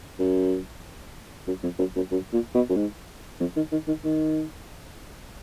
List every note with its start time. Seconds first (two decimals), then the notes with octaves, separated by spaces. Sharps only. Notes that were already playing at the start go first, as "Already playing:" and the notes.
0.19 F#2
1.47 F#2
1.63 F2
1.79 F#2
1.96 F#2
2.11 F#2
2.33 A#2
2.55 B2
2.69 F#2
2.76 G#2
3.40 F2
3.56 D#3
3.72 D#3
3.87 D#3
4.04 D#3